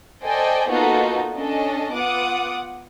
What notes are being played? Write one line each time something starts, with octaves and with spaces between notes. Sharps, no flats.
A4 C5 D5 D#5 G5 G#5
A#3 B3 D#4 F4 F#4 A4
C#4 D4 A4 D#5
B3 F4 F#5 D6 D#6